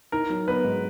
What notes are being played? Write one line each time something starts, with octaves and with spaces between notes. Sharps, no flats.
D#4 A#4
F#3
B3 B4
G#2